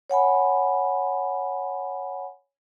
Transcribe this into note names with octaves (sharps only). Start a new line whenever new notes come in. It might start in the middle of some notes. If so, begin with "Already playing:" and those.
C#5 F#5 G#5 B5